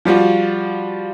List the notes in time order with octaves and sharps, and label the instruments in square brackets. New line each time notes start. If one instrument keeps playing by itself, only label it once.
[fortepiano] F3 G3 F4 F#4